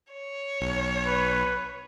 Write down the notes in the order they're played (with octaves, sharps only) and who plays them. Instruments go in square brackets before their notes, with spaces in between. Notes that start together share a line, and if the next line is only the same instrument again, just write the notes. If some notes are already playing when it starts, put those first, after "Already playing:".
[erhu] C#5
[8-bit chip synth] B1
[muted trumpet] B4